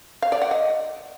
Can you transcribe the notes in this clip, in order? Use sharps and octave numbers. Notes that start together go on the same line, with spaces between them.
F5
D5
F#5
D#5